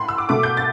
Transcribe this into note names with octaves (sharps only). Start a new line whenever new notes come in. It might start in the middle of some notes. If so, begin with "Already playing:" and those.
Already playing: A2 B5 C6
E6
D6
B2 A3 D6
G6
A6